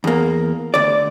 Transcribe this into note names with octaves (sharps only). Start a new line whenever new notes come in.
E2 A#3
D2 D5